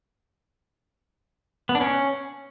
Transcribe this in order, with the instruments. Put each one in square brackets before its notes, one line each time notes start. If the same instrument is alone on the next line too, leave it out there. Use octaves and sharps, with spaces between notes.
[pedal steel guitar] B3
D4
C#4